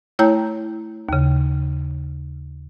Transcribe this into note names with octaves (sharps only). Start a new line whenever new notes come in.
A3 E4 C#5 G5 A#5 G6
D#2 C#3